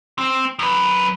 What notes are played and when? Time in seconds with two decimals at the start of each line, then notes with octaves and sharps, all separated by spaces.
0.19 C4
0.59 F#2 B4